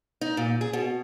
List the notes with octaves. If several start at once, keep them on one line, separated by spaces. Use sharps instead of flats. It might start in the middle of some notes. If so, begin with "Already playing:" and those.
D#4
A#2
G#4
B2